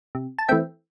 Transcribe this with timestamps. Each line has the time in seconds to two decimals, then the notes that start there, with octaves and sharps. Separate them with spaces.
0.15 C3
0.38 A5
0.48 E3 A3 C4 E5 G5